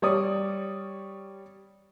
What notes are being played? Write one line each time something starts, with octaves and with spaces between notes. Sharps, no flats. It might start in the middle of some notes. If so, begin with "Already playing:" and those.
G3 C#5 D5 D#6